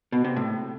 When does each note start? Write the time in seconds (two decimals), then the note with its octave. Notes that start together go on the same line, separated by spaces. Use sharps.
0.12 B2
0.24 C3
0.36 A2